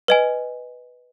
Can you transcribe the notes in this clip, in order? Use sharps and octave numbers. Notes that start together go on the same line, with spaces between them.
B4 D#5 G#5